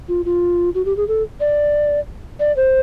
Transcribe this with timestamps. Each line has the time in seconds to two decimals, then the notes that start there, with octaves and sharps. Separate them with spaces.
0.08 F4
0.25 F4
0.75 F#4
0.85 G4
0.97 G#4
1.08 A4
1.40 D5
2.40 D5
2.56 C5